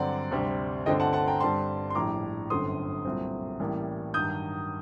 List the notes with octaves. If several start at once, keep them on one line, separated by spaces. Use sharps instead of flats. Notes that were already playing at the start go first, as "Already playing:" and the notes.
Already playing: G2 D3 F#3 C4 D5 F#5
D2 C3 G3 C4
G1 G2 D3 A3 C4 D#5 G5
F#5 A5
F#5 A5
G5 A#5
G2 D3 G3 C4 A5 C6
C6
A#1 A2 G3 A#5 D6
G1 F#2 D3 A3 C4 C6 D#6
C2 A#2 F#3 A3 C4
A1 A2 G3 A#3
G2 D#3 F#3 D#6 G6